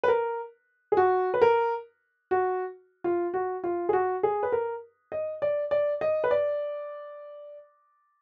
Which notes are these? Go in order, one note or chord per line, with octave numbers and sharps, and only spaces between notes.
B4
A#4
G#4
F#4
B4
A#4
F#4
F4
F#4
F4
G#4
F#4
G#4
B4
A#4
D#5
D5
D5
D#5
B4
D5